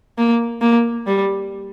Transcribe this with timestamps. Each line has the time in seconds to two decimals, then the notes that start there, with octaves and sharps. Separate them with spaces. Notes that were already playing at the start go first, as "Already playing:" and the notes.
0.18 A#3
0.61 A#3
1.07 G3